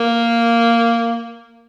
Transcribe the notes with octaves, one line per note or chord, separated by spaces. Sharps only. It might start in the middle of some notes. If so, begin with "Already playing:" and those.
Already playing: A#3